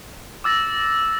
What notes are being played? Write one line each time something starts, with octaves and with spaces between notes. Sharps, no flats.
D6 E6 A6 A#6